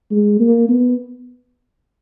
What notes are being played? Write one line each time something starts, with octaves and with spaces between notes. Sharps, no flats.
G#3
A#3
B3